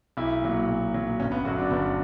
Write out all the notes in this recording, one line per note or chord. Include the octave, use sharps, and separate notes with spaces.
B1 E4
A#2 F#3
B1
A#2 F#3
G1 C#4
B3
F#2 D3 F#3 F#4
D4
G1 B3